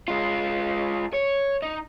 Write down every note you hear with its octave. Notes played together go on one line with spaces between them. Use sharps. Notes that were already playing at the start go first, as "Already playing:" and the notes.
G#3 F4
C#5
D#4